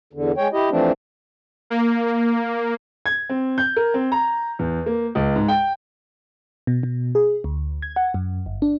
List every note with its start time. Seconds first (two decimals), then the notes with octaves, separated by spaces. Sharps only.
0.13 E2 D3
0.37 G#3 C#5 G5
0.53 E4 G4 D#5
0.70 E3 F3 A3 C4 D4
1.70 A#3
3.06 G#6
3.29 C4
3.58 G6
3.76 A#4
3.94 C4
4.12 A#5
4.59 E2
4.86 A#3
5.15 C#2
5.36 G#2
5.48 G5
6.67 B2
6.83 B2
7.15 G#4
7.44 D2
7.82 G#6
7.96 F#5
8.14 F#2
8.46 G1
8.62 D4